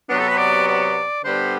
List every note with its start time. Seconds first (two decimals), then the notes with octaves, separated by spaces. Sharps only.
0.09 C3 F#3 B3 D4
0.19 A4
0.28 B4
0.38 D5
0.67 D5
1.24 D3 G3 B3 C5